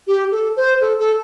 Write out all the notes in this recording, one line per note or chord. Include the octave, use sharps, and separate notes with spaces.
G4
A4
C5
A4
A4